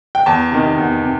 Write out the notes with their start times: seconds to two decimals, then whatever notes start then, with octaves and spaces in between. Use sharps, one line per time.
0.15 G5
0.26 E2 A5
0.52 C3 D#3
0.78 E2
1.04 C3